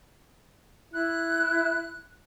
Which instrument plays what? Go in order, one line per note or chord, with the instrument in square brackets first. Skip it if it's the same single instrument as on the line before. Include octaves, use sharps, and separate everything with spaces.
[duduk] E4 [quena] F#6